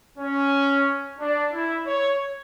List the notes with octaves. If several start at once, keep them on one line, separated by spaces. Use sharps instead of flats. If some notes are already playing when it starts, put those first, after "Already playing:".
C#4
D4
E4
C#5